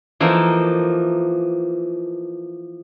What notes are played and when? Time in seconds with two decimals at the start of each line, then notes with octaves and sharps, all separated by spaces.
0.20 E3 F3 A#3 D#4 A4